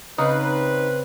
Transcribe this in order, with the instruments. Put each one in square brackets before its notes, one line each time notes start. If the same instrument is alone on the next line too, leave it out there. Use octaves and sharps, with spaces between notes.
[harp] C#3 [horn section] C4 B4 [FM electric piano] D#4